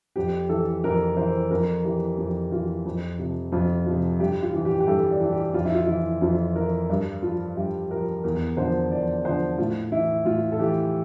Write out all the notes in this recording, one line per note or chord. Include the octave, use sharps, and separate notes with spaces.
F2 G4
E3 A4
F2 A#4
E3 C5
F2 A#4
E3 G4
F2 G4
E3 F4
F2
C3 F3
F2 F4
C3 F3 F4
G2 G4
F4
E3
G4
G4
G2 A4
D5
E3
G4
F2 F4
E4
F4
E3 E4
F2 F4
E3 A#4
G2
F3 F4
G2 G4
F3 A#4
E2 A#4
D3 F3 C5
E2 D5
D3 F3 C5
A2 F4
E3 E4
A2 F4
A4
E3 G4